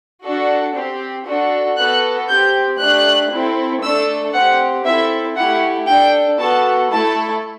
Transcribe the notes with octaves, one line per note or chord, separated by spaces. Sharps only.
D4 F#4 A4
C4 G4
D4 F#4 A4
B3 F#4 A4 F#6
C4 G4 G6
A3 D4 G4 F#6
C4 E4 A4
A3 D4 A4 E6
C4 G4 F#5
C4 E4 A4 E5
A3 E4 G4 F#5
D4 A4 G5
B3 F#4 A4 A5
A3 E4 A4 A5